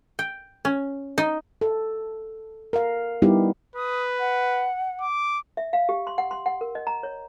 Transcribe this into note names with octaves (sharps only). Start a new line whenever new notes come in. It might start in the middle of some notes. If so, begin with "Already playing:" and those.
G5
C#4
D#4
A4
A#4 F5
G3 B3 D#4 E4 G4
B4 D#6
F#5
D6
E5
F5
G4
C6
F#5
C6
F#5
A#4
D#5
A#5
C#5